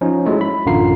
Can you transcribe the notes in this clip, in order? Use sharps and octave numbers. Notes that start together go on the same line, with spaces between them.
F3 C#4 D#4
F#3 G#3 A3 E4
B5
A1 F#2 D3 F4 A#5 C7